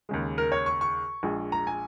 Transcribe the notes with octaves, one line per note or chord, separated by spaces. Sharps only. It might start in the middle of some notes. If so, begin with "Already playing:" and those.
D#2 C#3 G#3
A#4
C#5
C#6
C#6
A#1 A#2 G#3
A#5
G#5